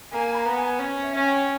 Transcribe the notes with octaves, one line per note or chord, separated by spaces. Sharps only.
A#3 G#5
B5
A#5
B3
G#5
C#4
E5
C#4 G#5
G5